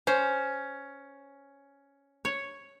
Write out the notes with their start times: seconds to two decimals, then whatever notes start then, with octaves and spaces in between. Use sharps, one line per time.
0.07 C#4 C5
2.25 C#5